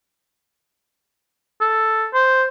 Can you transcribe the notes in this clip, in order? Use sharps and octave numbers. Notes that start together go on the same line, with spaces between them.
A4
C5